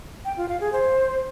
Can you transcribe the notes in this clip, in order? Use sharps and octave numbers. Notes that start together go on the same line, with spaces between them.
G5
F4
F5
G#4
C5